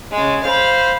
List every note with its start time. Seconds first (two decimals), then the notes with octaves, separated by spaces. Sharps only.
0.12 C#3 G#3
0.44 C5 F5 B5